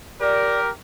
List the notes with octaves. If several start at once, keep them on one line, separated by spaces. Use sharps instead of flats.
G4 A#4 D5